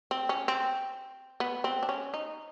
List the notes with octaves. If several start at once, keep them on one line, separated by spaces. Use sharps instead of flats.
C4
C#4
C4
B3
C4
D4
C#4
D#4